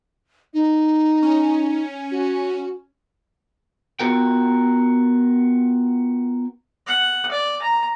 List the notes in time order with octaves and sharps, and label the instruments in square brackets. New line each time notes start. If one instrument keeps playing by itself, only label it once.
[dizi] D#4
[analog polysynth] C#4
[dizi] F#4
[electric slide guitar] B3 F4 F#4 A#4 G5
[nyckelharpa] F#5
D5
A#5